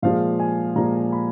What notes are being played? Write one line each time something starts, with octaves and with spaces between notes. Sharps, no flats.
A#2 F3 G#3 F5
G#5
A#2 F3 G#3 A#5
B5